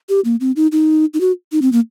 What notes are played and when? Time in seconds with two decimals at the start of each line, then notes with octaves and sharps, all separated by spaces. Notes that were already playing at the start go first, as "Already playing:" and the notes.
0.09 G4
0.25 A#3
0.40 C4
0.56 D#4
0.72 D#4
1.14 D#4
1.21 F#4
1.52 D#4
1.62 C4
1.72 A#3